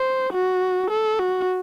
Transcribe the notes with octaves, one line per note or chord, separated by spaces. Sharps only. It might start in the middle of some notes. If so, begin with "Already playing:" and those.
Already playing: C5
F#4
A4
F#4